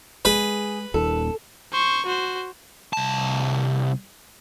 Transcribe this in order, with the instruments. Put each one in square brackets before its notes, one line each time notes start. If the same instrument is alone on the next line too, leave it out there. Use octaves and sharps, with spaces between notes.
[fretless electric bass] G#3 [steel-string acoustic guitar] G#4 [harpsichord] B4
[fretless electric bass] D#1 D#2 A#2 [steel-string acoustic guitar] A4
[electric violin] C5 C#6
F#4 C5
[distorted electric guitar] C2 A5